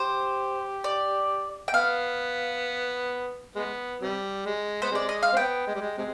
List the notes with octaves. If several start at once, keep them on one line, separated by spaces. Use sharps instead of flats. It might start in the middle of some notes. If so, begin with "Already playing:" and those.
Already playing: G4 C5
D5
G5
B3 F5
G#3 B3
C3 G3
G#3
B3 C5
C3 G#3 D5
D#5
F5
C4
B3 G5
G#3
G3
G#3
C3 G#3